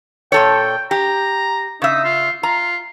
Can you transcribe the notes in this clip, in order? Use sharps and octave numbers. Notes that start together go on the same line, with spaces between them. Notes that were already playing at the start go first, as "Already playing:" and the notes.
A#2 A4 C#5 G5
G4 A#5
C#3 D#4 E5
F4
F4 A#5